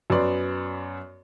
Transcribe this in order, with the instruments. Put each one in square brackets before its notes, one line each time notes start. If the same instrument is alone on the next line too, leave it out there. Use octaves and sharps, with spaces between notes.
[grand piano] F#2 B3 D5 C6